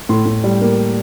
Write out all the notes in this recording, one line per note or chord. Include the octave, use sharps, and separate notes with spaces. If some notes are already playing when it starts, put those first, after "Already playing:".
A2 C6
A2
G3
A#3